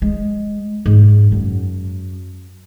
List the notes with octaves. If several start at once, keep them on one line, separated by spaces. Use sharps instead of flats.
G#3
G#2
F#2